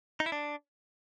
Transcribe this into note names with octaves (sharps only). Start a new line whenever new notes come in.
D#4
E4
D4